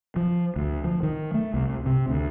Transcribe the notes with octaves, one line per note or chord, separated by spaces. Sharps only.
F3
D2
F3
D#3
A3
C2
C3
D2